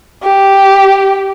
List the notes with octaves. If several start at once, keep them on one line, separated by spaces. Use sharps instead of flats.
G4